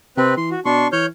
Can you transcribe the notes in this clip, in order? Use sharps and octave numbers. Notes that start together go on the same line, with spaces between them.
C3 C4 B4
E3 C6
F#4
B2 D4 C6 C#6
E3 C#5 F6 G6